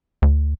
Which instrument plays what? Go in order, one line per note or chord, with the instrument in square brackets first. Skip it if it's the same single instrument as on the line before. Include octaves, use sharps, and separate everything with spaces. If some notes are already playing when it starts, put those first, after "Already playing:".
[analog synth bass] D2